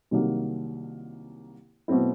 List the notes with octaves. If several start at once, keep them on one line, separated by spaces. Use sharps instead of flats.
C2 C3 D#3 F#3 A#3
B2 F#3 A3 C4 E4